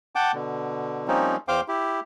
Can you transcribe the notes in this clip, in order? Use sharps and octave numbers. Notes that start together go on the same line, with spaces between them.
F#5 G5 A5 D6
B2 D3
F3 G3 A#3 C4 C#4 D#4
E2 C5 F5 G5 D6
E4 G4